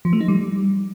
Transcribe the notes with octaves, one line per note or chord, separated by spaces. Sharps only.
F3
A3
D#4
G3